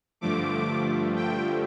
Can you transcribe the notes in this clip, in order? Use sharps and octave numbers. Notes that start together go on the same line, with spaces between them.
G2 D3 F3 A3 D6
G5